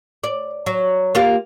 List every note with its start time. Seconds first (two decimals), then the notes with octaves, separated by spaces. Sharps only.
0.24 D5
0.66 F#3
1.15 A#3 F4 G4